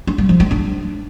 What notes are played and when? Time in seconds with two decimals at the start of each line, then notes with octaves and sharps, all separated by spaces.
0.07 D4
0.18 G3
0.29 F3
0.40 G#3
0.51 D4